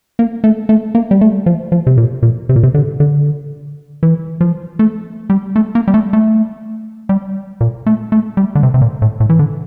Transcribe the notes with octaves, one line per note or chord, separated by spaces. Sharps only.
A#3
A3
A3
A#3
G3
A3
F3
F3
C3
A#2
A#2
C3
A#2
C3
D3
D3
E3
F3
A3
G3
A3
A#3
G3
A3
A3
G3
A#2
A3
A3
G3
D3
C3
C3
A#2
A2
A2
E3
D3